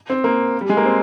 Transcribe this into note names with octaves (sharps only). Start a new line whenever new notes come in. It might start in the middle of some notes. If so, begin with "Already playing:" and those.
C4
A#3
G3
G#3
A#3
C4